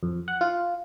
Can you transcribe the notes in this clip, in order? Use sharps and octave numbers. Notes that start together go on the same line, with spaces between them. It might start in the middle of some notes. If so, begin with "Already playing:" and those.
F2
F#5
F4